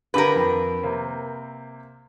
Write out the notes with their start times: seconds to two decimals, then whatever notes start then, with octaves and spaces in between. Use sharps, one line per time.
0.14 G2 D3 G4 A#4 B4
0.36 F2
0.83 C3 A#3 C4